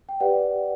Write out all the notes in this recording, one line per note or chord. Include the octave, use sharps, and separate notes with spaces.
G5
G4 B4 D5 F#5